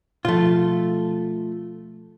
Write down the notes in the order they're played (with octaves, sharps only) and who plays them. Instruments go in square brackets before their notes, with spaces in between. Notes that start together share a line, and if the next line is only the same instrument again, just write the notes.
[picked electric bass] B2 F3 [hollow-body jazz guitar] A3 F4